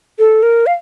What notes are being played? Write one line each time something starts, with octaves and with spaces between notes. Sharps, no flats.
A4
A#4
F5